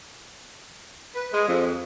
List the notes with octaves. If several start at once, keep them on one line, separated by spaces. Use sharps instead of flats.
B4
G#3
F2